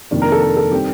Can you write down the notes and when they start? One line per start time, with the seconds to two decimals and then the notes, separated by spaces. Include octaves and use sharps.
0.11 F2 C3 D#3 A#3 D4
0.22 A#4
0.32 A4
0.42 A#4
0.57 A4
0.72 D#3 G3 C4 G4